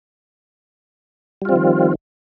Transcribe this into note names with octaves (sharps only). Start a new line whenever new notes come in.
D#3 F3 G3 C4 F4